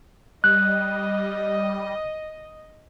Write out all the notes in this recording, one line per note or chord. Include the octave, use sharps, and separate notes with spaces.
G3 D#5 F#6